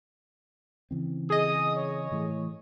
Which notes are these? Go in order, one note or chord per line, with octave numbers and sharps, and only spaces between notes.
C#3 E3 C4
G#4 D#5 D#6
C#5
A2 E3 A3